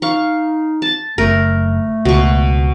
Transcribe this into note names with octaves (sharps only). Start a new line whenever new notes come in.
D#4 F5 C#6
A5
F#1 A3 A#4
C#2 B2 C#6